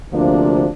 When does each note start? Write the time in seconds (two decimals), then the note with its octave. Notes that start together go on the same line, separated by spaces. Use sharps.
0.12 D2 C3 F3 A#3 D4